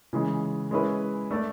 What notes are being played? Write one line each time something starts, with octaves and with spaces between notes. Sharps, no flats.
C#3 E3 G#3
G#3 C#4 E4 B4
A3 D4 A4 D5